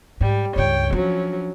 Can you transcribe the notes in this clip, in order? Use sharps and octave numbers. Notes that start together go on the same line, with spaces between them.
G#2 G3
C#2 G2 C#5 G5
F3 F#3 C#4 D4